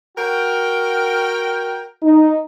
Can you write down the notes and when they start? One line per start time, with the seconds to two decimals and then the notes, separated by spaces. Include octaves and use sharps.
0.17 F#4 A#4 G5
2.03 D#4